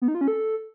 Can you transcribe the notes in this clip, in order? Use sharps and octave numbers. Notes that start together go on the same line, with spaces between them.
B3
D#4
F4
C#4
A4